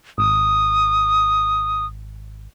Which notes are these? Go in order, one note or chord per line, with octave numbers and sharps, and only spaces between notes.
G#1 D#6